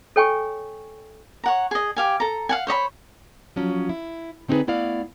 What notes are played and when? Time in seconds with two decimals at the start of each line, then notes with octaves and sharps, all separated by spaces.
0.16 A4 C#5 G5 G#5 C#6
1.44 C#5 F#5 A#5
1.71 G#4 D#5
1.96 G4 F5 G#5
2.20 A4 A#5
2.49 F5 F#5 G#5
2.67 C5 C#5 D#5 B5
3.56 F3 F#3 C#4
3.89 E4
4.48 D3 C4 D#4 E4 G#4 B4
4.67 A3 B3 E4 D5 F5